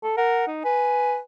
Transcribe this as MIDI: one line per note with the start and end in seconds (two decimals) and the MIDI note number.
0.03 0.13 69
0.17 0.44 70
0.17 0.46 78
0.47 0.61 63
0.64 1.20 71
0.64 1.17 80